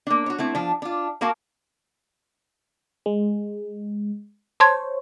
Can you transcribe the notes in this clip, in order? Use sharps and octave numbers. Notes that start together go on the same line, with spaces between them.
A#3 D4
F#4 C#5
A3 C4 E4
F3 D4
D4 F4
A#3 F#4 A#4 F5 A5
G#3
C5 C#5 A5 C6 G#6